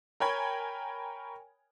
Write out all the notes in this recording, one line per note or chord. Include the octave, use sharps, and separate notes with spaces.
A#4 C#5 G5 G#5 B5 G#6